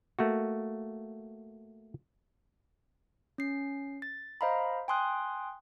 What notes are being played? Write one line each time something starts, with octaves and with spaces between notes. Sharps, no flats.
A3 A#3 F#4
C#4 C7
A6
C5 D#5 F5 A#5 B5
G5 G#5 C6 D#6 F#6